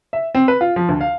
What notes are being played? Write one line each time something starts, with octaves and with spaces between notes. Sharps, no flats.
E5
C4
B4
F4
F3
D2
F5